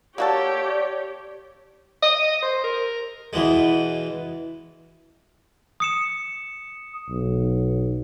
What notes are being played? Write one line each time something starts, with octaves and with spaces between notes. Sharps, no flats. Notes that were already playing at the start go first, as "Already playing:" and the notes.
A#3 F#4 G4 A4 C#5 D5
D#5
C5
A#4
E2 B2 E3 G#3
D#6 C#7 E7
B1